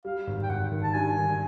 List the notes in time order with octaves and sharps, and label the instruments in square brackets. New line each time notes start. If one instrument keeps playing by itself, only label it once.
[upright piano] G3 [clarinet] F5
[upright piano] G#1
[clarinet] G5
[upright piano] G#1 [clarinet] F#5
[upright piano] D#3
[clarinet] A5
[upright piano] G2 [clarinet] G#5
[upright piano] D#3